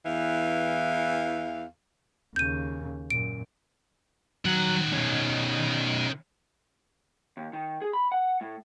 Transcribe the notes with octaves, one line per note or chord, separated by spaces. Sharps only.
E2 E3 F5
D#2 C#3 G6 D#7
F#2 A#2 D7
D#3 F#3 F#5
B2 C#4
D#2
D#3
G#4
B5
F#5
A2